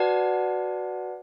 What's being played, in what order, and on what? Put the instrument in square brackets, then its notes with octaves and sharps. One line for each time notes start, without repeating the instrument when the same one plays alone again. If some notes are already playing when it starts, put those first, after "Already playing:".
Already playing: [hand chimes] F#4 B4 D5 F#5 A5